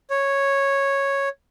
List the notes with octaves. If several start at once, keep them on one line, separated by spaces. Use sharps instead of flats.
C#5